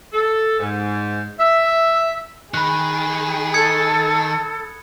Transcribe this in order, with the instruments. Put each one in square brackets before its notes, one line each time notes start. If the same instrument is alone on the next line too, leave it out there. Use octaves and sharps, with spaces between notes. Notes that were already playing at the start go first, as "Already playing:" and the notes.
[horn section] A4
G#2
E5
[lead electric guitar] D#3 [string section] G#4 [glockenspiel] B5 F#6
[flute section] A4 [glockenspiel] D#6 G#6 C#7